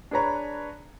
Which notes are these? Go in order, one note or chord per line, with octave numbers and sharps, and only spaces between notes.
D4 G#4 B4 C#5 A#5 B5